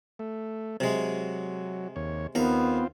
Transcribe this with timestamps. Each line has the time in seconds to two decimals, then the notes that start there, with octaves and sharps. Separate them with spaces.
0.19 A3
0.80 C3 F#3 G#3
1.96 D#2 C#5
2.35 D#2 B3 C4 F4 A#5